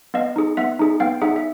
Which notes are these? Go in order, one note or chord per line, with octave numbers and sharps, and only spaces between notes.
B3 D#5 F5
D#4 G#4
B3 E5 F#5
D#4 G#4
B3 F5 G5
D#4 G#4 E5 F#5
E5